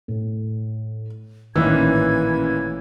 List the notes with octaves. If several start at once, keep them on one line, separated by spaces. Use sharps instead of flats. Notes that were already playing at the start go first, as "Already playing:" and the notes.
A2
A1 A#2 D#3 E3 C#4 B4 E6 G#6